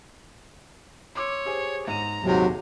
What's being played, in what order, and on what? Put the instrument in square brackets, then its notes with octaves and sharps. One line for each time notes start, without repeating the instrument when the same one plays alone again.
[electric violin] C#5 [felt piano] C6 D6 E6
[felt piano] G4 G#4 C5
[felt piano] G#2 D#7 [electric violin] A#5
[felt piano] D#1 [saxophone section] G#2 C3 [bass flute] F#3